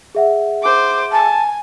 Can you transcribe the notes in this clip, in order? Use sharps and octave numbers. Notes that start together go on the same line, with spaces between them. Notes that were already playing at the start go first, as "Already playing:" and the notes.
G#4 E5 F#5
C5 D6
G#5 A5